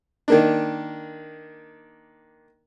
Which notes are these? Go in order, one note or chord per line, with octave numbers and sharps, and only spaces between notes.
D#3 A#3 D4